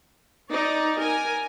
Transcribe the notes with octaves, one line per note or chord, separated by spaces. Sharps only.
D#4 D5
A#4 G#5